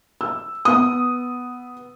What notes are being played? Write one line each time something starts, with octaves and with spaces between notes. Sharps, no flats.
E6
B3 D#6